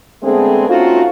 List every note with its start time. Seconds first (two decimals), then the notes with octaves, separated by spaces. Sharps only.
0.22 D3 G#3 A3 B3 C4 G#4
0.68 A3 C4 C#4 D#4 F4 F#4